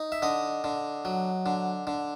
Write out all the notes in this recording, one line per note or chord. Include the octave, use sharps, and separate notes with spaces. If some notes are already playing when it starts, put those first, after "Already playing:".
Already playing: D#4
E5
D3 D#5
D3
F#3
D3
D3